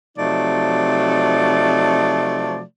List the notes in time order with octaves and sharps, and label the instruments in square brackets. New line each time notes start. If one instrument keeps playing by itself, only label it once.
[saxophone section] C3 F3 F#3 A3 D#4 D5